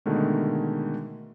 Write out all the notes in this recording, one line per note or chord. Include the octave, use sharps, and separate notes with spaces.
B2 D3 D#3 G#3 A3